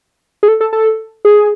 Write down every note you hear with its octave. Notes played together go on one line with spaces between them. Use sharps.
G#4
A4
A4
A4
G#4